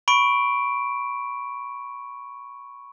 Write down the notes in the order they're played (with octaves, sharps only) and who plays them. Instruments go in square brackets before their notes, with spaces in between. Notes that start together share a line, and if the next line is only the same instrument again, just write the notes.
[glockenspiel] B5 C#6 D7